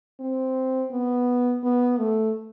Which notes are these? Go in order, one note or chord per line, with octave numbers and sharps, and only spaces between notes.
C4
B3
B3
A3